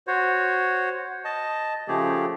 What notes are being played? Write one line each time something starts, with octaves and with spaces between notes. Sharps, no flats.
F#4 C5 C#5
D#5 A5
C#3 F3 A3 G4 G#4